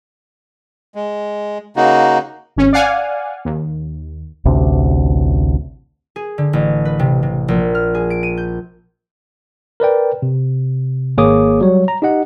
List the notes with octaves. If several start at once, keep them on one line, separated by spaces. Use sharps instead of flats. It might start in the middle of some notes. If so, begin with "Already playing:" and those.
G#3
C#3 A#3 D#4 F#4
G#1 C#4
D5 F5 F#5 G#5
D#2
A1 D2 C3
G#4
D3
A1
B4
C3
C3
A#1
F6
G#4
D7
D#7
G6
A#4 B4 D5 G5
C3
G#1 A#3 G#4 C#5 D6 D#6
F#3 G3 C#5
A#5
D#4 G4 D#5 F#5